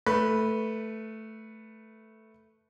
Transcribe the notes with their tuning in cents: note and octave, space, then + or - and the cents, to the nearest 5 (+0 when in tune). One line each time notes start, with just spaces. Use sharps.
A3 +0 B4 -10